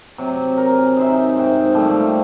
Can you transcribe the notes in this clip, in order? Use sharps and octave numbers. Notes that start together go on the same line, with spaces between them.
C3 F#3
A#4
G#5
D#4 C5 E5
G#2 G5
A#2 F3 G3 A3